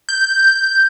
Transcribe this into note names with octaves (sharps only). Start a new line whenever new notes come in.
G6